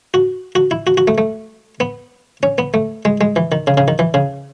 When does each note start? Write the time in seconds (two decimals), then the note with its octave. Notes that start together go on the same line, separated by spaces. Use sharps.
0.14 F#4
0.55 F#4
0.71 E4
0.87 F#4
0.97 F#4
1.08 A3
1.18 A3
1.80 B3
2.43 C#4
2.58 B3
2.74 A3
3.05 G#3
3.21 G#3
3.36 E3
3.52 D#3
3.67 C#3
3.77 C#3
3.88 D#3
3.99 E3
4.14 C#3